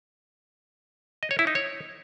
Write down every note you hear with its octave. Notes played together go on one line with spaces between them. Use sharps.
D#5
C#5
E4
D#4
C#5